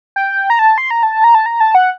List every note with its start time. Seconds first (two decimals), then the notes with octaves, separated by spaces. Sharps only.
0.16 G5
0.50 A#5
0.59 A5
0.78 C6
0.91 A#5
1.03 A5
1.24 A#5
1.35 A5
1.46 A#5
1.60 A5
1.75 F#5